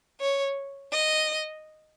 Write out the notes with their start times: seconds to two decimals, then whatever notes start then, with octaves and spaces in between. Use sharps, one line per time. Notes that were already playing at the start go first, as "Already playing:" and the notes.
0.21 C#5
0.92 D#5